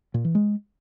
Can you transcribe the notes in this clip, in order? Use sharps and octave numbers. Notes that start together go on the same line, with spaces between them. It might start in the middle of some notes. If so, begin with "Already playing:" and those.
A#2
E3
G#3